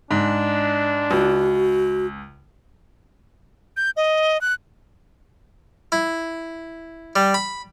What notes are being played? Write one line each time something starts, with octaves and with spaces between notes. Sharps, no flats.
G#2 D4
C#2 F#4
G6
D#5
F#6
E4
G3
B5